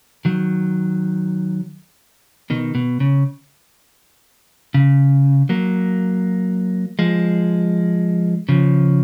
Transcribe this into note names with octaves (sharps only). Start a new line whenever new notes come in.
D#3 F#3
B2 D#3
B2
C#3
C#3
F#3 A#3
F3 G#3
C#3 F3